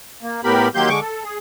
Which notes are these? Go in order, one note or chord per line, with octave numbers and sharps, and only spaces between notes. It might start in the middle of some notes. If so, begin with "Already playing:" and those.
A#3
A2 B3 G4 A#4 B5
D#3 F#3 A#3 G4 C6 G6
D3 G#3 C#6 D6
A4
G#4